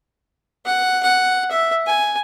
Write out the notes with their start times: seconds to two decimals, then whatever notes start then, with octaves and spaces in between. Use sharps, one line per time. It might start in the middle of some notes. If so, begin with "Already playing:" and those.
0.65 F#5
1.03 F#5
1.51 E5
1.86 G#5